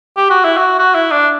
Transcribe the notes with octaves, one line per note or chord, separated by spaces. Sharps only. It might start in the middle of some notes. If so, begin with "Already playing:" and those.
G4
F#4
E4
F#4
F#4
E4
D4